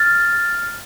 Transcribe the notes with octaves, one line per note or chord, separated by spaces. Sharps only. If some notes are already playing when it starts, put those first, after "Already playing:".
Already playing: F6 A6